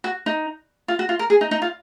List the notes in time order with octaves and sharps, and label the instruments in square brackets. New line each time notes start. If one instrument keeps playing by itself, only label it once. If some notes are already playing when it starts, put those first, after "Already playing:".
[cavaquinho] F#4
D#4
F4
F#4
F4
A#4
G#4
D#4
D#4
F4